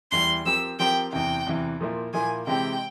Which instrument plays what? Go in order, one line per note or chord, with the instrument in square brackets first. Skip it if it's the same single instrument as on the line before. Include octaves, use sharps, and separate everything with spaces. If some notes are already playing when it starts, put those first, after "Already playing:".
[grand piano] E2 E3 G3 [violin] C6
[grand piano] F3 C4 G4 A#4 [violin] E6
[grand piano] F3 C4 G4 A#4 [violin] G5
[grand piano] E2 C3 E3 [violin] G5
[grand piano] E2 C3 E3
A#2 F3 A#3 E4
[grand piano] A#2 F3 A#3 E4 [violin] G#5
[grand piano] C3 E3 G#3 C4 G4 [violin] G5